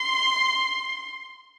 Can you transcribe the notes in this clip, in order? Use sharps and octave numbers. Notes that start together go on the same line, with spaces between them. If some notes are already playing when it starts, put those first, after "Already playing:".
Already playing: C6